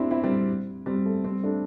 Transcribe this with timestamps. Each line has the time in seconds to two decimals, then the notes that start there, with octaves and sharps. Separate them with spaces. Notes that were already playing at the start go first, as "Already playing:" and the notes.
Already playing: C4 D4 E4 G4
0.11 C4 E4
0.24 G3 C4
0.86 G3 C4
1.06 A3
1.24 G3 C4
1.43 A3 D4